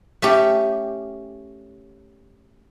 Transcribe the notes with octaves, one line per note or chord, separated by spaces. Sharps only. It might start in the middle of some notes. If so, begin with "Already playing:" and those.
A3 C#4 G4